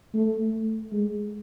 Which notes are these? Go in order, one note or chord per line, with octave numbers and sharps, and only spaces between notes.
A3
G#3